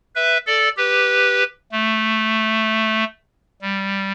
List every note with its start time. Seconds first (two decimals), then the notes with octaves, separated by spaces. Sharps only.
0.15 B4 E5
0.47 A4 D5
0.77 G4 B4
1.72 A3
3.62 G3